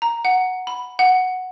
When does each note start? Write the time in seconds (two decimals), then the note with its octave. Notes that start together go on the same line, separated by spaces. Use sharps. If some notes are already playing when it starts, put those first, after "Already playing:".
0.02 A#5
0.25 F#5
0.67 B5
0.99 F#5